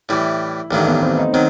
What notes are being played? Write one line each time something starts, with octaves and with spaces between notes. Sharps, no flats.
A2 E3 G3 E4
A1 G2 D#3 F#3 A3
B3
C4
D#4
D#3 F#3 C4